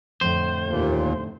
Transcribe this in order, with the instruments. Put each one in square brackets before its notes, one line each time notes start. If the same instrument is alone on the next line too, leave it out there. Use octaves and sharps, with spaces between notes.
[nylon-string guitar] F2 A2 D3 [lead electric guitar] C5
[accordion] D#2 A#2